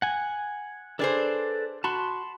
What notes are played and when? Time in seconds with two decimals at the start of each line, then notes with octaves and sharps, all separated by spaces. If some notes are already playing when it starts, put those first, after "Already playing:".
0.02 F#5 G#5
0.99 D4 G#4 A4 B4 C5 D5
1.84 F#4 A5 B5 C6